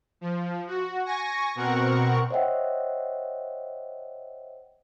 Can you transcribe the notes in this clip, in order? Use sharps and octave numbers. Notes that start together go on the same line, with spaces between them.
F3
F#4
G#5 C#6 A#6
B2 C4 A#4 F#5 C#6
C5 C#5 D#5 E5 F#5 G5